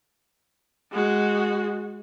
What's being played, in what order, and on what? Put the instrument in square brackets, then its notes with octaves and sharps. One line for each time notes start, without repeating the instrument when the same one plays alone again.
[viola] G#3 F#4